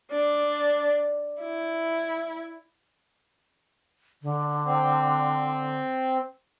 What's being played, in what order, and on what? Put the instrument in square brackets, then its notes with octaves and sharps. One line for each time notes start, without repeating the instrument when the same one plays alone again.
[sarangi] D4
E4
[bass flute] D3
[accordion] C4